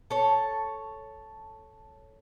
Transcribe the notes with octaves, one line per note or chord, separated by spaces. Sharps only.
A4 C#5